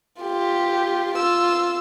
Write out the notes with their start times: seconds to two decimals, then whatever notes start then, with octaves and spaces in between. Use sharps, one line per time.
0.21 F4 G4
1.15 F4 E6